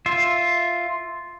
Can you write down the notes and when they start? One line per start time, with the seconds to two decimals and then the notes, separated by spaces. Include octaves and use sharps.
0.06 F4 E5